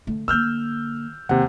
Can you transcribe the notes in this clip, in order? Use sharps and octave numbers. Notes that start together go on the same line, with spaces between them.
D3 A3
D3 A#3 E6 F6 G6
D#2 C3 F#5